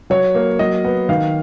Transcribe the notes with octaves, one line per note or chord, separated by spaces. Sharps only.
F#3 C#5
A#3
F#3 D#5
B3
D#3 F5